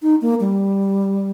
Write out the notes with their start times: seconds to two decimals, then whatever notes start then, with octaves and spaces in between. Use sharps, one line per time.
0.02 D#4
0.21 A#3
0.40 G3